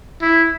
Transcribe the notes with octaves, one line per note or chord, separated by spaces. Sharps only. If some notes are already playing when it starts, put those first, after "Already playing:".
E4